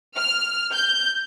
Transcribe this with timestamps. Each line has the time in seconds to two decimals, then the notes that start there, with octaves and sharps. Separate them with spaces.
0.17 F6
0.73 G6